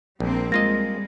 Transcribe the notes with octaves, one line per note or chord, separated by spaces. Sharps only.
A#1 G3 A#3 C4
G3 G#3 A#3 F4 D#5 A#6